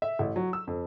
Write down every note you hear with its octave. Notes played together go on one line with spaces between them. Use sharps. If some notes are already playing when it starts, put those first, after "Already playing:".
E5
A1
F#3
E6
F2